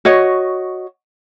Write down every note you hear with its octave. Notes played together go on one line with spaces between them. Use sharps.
F#4 C#5 D#5